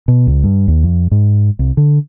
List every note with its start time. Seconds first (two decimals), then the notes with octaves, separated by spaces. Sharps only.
0.08 B2
0.27 C#2
0.44 G2
0.68 D#2
0.83 F2
1.11 G#2
1.59 C2
1.77 D3